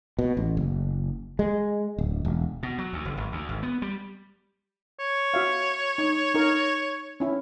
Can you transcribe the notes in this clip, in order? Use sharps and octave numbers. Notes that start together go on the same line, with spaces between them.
B2
A1
F#1
G#3
D1
E1
B2
F#3
D2
F#1
G#1
D2
G#1
B3
G3
C#5
F#4 E5 F5
D#4
D#4 A#4
C#4 E4